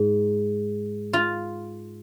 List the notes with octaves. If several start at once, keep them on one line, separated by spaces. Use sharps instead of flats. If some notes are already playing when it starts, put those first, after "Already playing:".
Already playing: G#2
F4